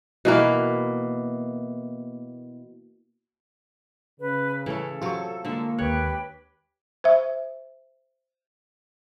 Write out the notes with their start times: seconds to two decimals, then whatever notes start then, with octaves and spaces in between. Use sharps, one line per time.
0.25 B2 E3 A#3
4.20 C#3 B4
4.66 E3 A3 C#4 A4
5.02 C3 F#3 F4 C#6
5.45 D3 G#3 A#3 E5
5.79 D#2 G4 B4 C#5 G5 F#6
7.04 C5 E5